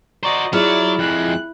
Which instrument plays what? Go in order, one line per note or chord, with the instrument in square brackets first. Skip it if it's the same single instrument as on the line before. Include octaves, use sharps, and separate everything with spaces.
[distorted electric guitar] F#4 C5 [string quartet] D5 D#5 [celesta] A#5 C#6 F#7
[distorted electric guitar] F#3 [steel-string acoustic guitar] E4 [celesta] F4 G#4 F6 [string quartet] D5
[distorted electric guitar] F2 G#3 [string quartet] F#6